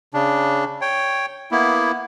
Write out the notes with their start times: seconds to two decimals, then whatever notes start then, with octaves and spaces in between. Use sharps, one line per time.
0.14 C#3 D4
0.81 C#5 G5
1.51 A#3 B3 E4